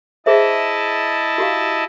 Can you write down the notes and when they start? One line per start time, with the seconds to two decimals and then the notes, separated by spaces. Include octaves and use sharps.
0.26 E4 G#4 C5 D#5 E5 A5
1.38 F#4 G4 F5